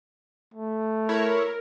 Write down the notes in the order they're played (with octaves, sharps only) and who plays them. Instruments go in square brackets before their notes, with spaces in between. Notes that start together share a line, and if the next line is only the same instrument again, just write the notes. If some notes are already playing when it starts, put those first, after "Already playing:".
[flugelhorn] A3
[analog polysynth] E4 C#5 [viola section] A#4